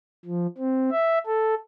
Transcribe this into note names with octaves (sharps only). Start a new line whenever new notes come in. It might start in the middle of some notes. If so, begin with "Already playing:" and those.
F3
C4
E5
A4